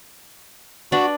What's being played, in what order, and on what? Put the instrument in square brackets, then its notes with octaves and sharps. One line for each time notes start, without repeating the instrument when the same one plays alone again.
[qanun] D4 B4 D5 [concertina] F#4